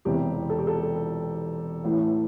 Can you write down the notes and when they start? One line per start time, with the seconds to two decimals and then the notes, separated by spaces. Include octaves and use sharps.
0.05 E1 E2 C3 G4
0.50 A4
0.59 G4
0.67 A4
1.84 A1 A2 E3